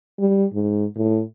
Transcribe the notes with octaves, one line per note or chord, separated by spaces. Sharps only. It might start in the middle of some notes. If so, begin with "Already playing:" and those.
G3
G#2
A2